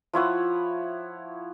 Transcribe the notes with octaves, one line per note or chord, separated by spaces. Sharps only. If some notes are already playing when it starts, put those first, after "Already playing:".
F3 E4 C#5 F#5